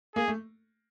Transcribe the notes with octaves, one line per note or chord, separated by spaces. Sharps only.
A#3 G#4
A3